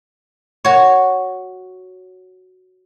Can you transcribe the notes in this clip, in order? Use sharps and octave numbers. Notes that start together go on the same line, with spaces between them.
F#4 C#5